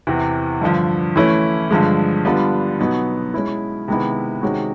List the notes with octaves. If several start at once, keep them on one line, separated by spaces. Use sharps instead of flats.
E2 C3 E3
G2 D3 F3
E3 A3 C#4 E4
G2 D3 F3 G#3
D3 G3 B3 D4 F4
B2 F#3 B3 D#4
G#3 C#4 E4
C3 D#3 G#3 B3 E4
C3 D#3 G#3 C#4 F#4